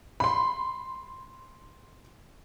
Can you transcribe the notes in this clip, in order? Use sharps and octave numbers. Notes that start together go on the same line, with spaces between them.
B5 C6